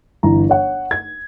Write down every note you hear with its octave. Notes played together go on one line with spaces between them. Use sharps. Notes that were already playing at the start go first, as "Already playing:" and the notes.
G1 E3 A#5
C#5 F#5
G#6